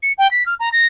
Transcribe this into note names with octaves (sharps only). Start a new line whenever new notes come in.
C#7
G5
B6
F6
A#5
A#6